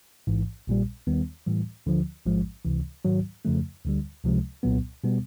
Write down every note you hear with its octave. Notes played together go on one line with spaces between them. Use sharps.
A1 G#2 E3
A#1 A#2 G3
D#2 D#3 G3 B3
A2 E3 G3
D2 D3 F3
A1 G#2 F3 G#3
C#2 C3 E3
G#2 D#3 F#3
F2 C#3 F3 A3
D2 D3 G3
C#2 C3 F3 G#3
C2 A#2 F#3 B3
B2 G3 B3